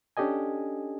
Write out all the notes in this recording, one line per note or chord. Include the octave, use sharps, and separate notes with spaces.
C#4 D4 G4 A4 D#5 G#5